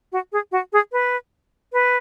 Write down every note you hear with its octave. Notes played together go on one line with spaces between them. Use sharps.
F#4
G#4
F#4
G#4
B4
B4